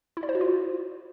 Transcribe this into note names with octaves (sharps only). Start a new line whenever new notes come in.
E4
D5
C5
F#4
F4